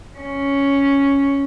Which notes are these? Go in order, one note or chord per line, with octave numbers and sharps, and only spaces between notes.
C#4